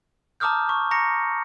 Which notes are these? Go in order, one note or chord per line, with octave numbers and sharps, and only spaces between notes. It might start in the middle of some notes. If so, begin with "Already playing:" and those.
A5 A#5 D6 D#6 F6 G6
C#6
A#5 C#6 A#6 C#7